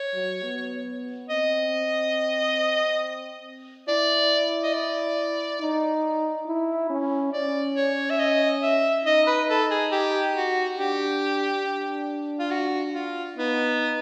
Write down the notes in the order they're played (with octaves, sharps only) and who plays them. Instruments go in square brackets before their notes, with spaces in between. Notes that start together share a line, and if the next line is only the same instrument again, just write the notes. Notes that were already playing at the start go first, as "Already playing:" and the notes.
Already playing: [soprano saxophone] C#5
[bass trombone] F#3
B3
[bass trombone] C4 [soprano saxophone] D#5
[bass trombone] E4 [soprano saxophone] D5
[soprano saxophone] D#5
D5
[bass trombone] D#4
E4
C#4
[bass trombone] C#4 [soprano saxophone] D5
[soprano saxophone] C#5
E5
D#5
E5
[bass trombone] D#4 [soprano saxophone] D#5
[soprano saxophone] B4
A4
G#4
G4
F#4
[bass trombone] D4 [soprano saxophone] G4
[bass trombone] D4
[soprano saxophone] F4
F#4
F4
[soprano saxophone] B3 [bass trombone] D#4